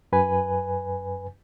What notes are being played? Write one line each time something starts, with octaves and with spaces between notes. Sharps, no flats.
F#2 B4 G#5